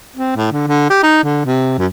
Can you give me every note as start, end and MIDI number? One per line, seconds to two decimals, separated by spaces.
0.16 0.35 60
0.36 0.49 45
0.52 0.67 50
0.68 0.85 50
0.90 0.99 67
1.03 1.20 63
1.24 1.44 50
1.46 1.78 48
1.78 1.87 42